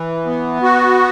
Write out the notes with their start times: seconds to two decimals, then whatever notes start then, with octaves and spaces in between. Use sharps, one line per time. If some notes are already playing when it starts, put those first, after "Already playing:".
Already playing: E3
0.26 B3
0.63 F#4